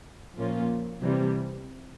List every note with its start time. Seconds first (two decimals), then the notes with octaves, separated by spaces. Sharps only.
0.37 A#2 F3 A#3 C#4 F4
1.02 C3 E3 G3